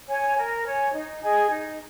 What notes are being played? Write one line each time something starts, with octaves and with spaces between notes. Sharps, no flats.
C#5 G#5
A#4
C#5 G#5
D#4
G#4 D#5 G#5
D#4